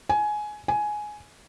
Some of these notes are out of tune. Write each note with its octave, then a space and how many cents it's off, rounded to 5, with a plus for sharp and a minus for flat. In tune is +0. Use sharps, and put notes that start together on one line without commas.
G#5 +15
G#5 +10